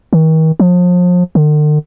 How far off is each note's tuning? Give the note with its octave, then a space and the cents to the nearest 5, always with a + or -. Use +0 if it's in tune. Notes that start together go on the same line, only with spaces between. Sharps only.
D#3 +40
F3 +35
D3 +45